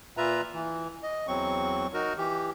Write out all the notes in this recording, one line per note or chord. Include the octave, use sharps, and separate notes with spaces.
A#2 F4 B4 E5 A#5
E3
D#5
E2 F#3 C4 C#6
D#4 F#4 A#4
E3 G4